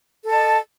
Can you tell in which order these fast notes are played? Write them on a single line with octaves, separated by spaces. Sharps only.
A4 A5 D#5